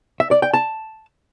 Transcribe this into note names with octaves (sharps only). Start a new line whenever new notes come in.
E5
D5
G5
A5